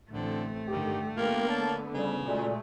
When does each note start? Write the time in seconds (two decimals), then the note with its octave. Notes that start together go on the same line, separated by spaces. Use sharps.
0.11 A1 D3 A3 C4
0.68 G2 D3 D#3 G4
1.17 D3 A#3 B3 F4 G4 A#4
1.48 A#4 C#5 A5
1.94 F2 C#3 G3
2.24 D2 A#2 G#3 A3